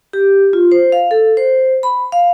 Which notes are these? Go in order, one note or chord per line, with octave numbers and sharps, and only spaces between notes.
G4
F4
C5
F5
A4
C5
B5
F5